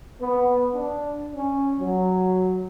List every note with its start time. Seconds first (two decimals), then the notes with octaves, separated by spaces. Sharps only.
0.20 B3
0.74 D4
1.35 C#4
1.79 F#3